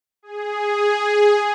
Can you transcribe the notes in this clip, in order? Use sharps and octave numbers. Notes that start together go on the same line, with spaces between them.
G#4